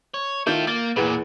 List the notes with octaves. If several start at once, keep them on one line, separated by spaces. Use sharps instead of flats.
C#5
D#3 E4 F4 A4 G6
A#3 A6
E2 A#2 G#4 B4